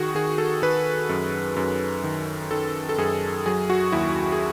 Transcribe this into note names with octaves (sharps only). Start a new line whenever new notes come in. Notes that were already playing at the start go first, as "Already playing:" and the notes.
Already playing: D#3 F#4 G#4
D#3 G#4
A4
D#3 B4
F#2
F#2
D#3
D#3 A4
A4
F#2 G#4
F#3 G#4
F#4
D#2 E4
G#4